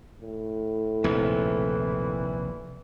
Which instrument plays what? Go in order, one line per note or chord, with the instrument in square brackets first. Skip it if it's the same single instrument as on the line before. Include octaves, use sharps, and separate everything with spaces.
[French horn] A2
[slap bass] A#1 D#2 [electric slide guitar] C3 [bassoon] E3